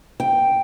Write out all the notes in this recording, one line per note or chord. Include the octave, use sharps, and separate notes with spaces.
G5